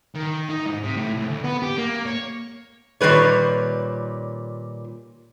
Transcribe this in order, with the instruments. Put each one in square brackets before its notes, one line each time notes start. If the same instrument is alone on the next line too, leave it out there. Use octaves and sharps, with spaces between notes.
[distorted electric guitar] D#3
D#4
G#2
C3
A2
C2
D2
B3
G4
A#3
C#5
[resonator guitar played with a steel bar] A#2 D#3 G3 B4 C#5